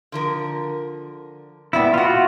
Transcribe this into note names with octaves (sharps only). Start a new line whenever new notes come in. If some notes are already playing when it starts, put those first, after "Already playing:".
D3 F3 A#4
B3 E4 D5 E5 G5
A#2 F4 F#4 F#5